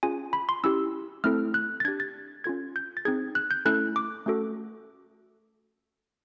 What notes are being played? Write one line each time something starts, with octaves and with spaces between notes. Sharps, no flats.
C#4 F4 G#4 G#5
B5
C6
C#4 E4 G4 E6
A3 C4 E4 A4 F6
F#6
A6
D4 G4 G#6
A6
C#4 F4 A4 G#6
G6
A6
C4 D#4 G#4 G#6
F#6
G6
A3 C#4 E4 A4 F#6
D6
A3 C#4 F#4 A4